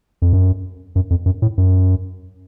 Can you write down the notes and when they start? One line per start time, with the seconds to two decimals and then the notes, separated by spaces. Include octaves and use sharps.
0.22 F2
0.33 F#2
0.95 F#2
1.10 F2
1.26 F#2
1.42 A2
1.58 F#2